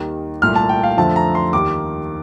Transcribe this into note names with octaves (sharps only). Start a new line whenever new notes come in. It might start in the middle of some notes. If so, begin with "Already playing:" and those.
Already playing: D#2 D#3 G3
C2 A#2 A3 F6
A5
G5
F5
F2 D3 F3 A3 A5
A#5
C6
D#2 D#3 G3 D6